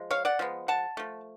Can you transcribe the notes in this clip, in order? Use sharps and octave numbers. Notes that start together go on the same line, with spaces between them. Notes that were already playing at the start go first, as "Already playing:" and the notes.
Already playing: F3 G#3
C#5 F5
D5 F#5
F3 G#3 B3
F#5 A5
F3 A3